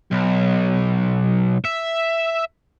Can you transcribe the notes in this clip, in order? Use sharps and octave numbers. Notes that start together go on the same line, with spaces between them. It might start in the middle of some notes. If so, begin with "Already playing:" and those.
B1
E5